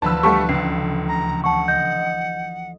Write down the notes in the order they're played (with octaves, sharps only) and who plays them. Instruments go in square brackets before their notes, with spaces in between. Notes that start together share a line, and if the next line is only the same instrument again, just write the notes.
[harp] D2 E3 F3 [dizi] B4 [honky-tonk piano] A5 B5 E6
[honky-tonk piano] G3 A3 [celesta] F#5 A5 C#6
[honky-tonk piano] C#2 [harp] A3 A4 [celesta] C7
[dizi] A#5
[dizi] F#5 [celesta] A5 C#6
[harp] D#5 [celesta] G6